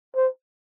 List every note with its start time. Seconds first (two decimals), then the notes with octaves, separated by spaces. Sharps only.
0.16 C5